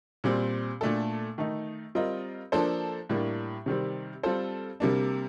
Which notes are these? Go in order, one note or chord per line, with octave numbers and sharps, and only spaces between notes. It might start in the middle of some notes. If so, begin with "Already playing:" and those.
A#2 G3 C4
A#2 A3 D4 A4
D#3 A3 D#4
G3 C4 F4 A#4 D#5
F3 A#3 D4 A4 C5
A2 G3 A#3 D4
C3 D#3 G3 C4
G3 C4 F4 A4 C5
C3 G3 A#3 D4